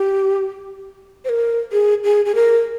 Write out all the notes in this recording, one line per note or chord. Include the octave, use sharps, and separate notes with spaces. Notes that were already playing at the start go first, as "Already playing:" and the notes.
Already playing: G4
C5
A#4
G#4
G#4
G#4
A#4